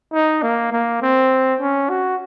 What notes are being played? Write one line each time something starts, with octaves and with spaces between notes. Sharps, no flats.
D#4
A#3
A#3
C4
C#4
F#4